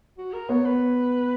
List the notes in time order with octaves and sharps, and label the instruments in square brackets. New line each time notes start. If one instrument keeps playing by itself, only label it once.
[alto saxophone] F#4
A#4
[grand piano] B3 [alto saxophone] C#5
[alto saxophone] B4